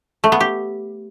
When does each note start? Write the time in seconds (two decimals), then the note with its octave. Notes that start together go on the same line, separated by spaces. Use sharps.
0.24 A3
0.32 B3
0.40 G4